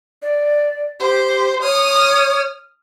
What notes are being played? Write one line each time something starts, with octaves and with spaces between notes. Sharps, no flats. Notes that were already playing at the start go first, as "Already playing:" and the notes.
D5
G4 C5
C#5 D#6 F6